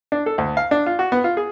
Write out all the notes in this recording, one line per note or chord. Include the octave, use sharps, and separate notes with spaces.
D4
A4
D2
F5
D4
F4
F#4
B3
F4
G#4